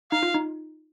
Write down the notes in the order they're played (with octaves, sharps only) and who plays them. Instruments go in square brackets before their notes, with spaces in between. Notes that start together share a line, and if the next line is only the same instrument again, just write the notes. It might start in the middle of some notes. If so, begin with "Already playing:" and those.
[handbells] D#4 [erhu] F5
[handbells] F4
D#4